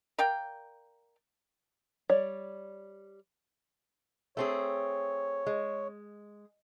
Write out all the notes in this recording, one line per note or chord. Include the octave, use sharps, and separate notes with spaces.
A#4 D5 F5 G5
G3 C#5 D5
A3 C4 G#4 C#5
G#3